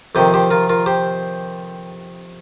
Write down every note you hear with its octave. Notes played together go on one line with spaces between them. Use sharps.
F2 C3 D#3 G4 C5
G4 C5
F4 A#4
F4 A#4
G4 C5